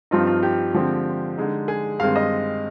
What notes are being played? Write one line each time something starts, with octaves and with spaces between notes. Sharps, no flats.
G2 F3 C4 D#4 F4
F4
G4
D3 F3 G#3 C4
D3 G#3 D#4
G#4
G2 D#3 G#3 C4 F5
D#5